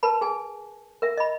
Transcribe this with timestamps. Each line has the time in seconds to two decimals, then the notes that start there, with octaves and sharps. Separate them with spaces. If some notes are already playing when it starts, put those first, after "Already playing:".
0.03 A#4 B4 A5 B5
0.21 G#4 G#5
1.02 A#4 E5
1.17 D#5 B5